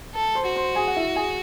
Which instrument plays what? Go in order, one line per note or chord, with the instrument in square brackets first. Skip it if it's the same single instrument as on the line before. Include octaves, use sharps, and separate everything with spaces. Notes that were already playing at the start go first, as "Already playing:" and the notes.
[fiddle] A4
[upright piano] C5 C6
[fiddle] F#4
[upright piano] C5 C6
G#4 G#5
F#5
E4 E5
G#4 G#5